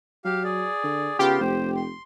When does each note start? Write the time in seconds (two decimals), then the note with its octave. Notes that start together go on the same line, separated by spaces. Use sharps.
0.25 F#3 G4 F5
0.44 G#4 D5
0.84 D3
1.19 C#3 B3 F4 G4 C6
1.41 F1 C5
1.76 C6